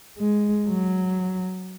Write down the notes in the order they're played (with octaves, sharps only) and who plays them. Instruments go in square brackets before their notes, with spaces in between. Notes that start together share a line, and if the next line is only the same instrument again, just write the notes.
[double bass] G#3
F#3